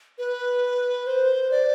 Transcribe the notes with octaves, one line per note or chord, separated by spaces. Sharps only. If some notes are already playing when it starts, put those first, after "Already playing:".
B4
C5
D5